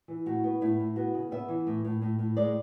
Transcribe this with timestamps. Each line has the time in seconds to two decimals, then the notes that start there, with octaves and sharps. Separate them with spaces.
0.08 E3
0.26 A2 F#4
0.44 B3
0.61 A2 E4
0.79 A2
0.96 B3 F#4
1.14 C#3
1.31 B3 E5
1.48 E3
1.67 A2
1.85 A2
2.02 A2
2.19 A2
2.37 G#3 D5